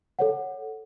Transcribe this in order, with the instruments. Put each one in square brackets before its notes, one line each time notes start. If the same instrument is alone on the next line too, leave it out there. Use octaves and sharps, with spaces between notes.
[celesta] A4 C#5 F#5